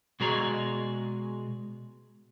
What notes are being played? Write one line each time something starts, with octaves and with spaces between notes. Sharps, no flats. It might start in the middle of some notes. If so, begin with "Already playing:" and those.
B2 G#3 F#4 G#4 D5 A#5